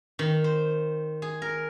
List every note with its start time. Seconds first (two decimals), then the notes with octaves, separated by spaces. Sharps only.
0.19 D#3
0.44 C5
1.22 G#4
1.42 A#4